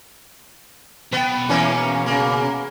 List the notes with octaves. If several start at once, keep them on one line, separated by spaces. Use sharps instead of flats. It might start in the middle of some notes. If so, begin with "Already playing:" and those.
B2 B3 G5
E3 A#3 C#4
C#3 A#3